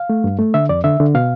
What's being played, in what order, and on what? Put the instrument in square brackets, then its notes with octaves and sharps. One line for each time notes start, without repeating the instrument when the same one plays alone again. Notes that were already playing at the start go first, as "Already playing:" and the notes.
Already playing: [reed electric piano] F5
A3
G2
A3
D3 E5
F2 D5
D3 E5
D3
B2 F5